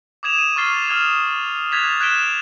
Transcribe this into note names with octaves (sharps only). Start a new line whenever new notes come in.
D6 D#6 G#6 E7 F7
D#7
C#6 D6 F6 A6 C7 G7
D#6 F6 G#6 F7
D6 F#6 G#6 A6 B6 F7
F#6 G#6 B6 D7 E7 G7